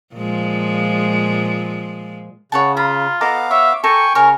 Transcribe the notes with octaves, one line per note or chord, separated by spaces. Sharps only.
A#2 F3 G#3
C#3 C#5 F#5 A5
F4 A#5 B5
B3 A4 D#5 F5 A#5 D6
C#5 E5
A4 G5 G#5 A#5 C#6
C#3 A#4 C#5 G#5 C#6